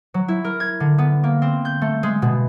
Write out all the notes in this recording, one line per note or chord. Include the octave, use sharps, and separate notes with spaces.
F#3
E4
A#4
G#6
D3
B3
A#3
C4
G6
A3
G#3
B2